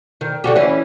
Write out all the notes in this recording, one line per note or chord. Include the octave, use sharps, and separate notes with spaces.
D#3
D3 F#4 G4
E3 C#4 E4